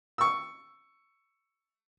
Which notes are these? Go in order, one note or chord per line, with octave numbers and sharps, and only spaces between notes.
C#6 E6